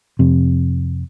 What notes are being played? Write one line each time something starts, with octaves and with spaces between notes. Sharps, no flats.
F2 C3